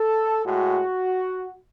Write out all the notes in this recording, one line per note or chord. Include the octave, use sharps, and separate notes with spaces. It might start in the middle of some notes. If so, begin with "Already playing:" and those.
Already playing: A4
A2 G#3 F#4